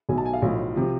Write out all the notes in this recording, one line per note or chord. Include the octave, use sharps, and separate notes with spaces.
B1 B2 G#5
A5
G#5
F5
B1 A2 F3
C3 F3